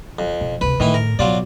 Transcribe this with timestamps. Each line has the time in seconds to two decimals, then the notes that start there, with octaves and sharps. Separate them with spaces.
0.19 F2
0.41 B2
0.61 D2 C3 B4
0.80 A2 D#3 E3 E4
0.94 A#4
1.19 B2 F#3 F4 D5